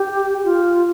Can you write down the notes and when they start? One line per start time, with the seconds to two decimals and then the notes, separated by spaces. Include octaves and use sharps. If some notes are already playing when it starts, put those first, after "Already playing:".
Already playing: G4
0.38 G4
0.45 F4